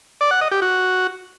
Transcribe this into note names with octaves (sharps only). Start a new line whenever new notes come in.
D5
F#5
D#5
G4
F#4